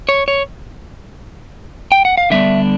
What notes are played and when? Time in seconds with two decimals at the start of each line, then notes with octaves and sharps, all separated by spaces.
0.09 C#5
0.28 C#5
1.92 G5
2.05 F#5
2.18 F5
2.30 D3 G3 B3 D4 E5